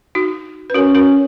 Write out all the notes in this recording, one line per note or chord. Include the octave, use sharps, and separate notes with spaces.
D#4 F#4
B4
C#4 F#4 A#4
F#4 A#4